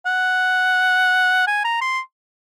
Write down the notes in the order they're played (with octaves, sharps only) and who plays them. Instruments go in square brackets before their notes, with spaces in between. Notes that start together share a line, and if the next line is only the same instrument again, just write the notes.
[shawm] F#5
G#5
A#5
C6